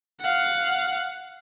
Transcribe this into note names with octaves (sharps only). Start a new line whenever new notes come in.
F5 F#5